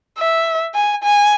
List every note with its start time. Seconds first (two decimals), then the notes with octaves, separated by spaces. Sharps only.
0.18 E5
0.75 G#5
1.04 G#5